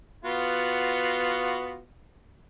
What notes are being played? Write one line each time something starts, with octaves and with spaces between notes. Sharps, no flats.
B3 F4 F#4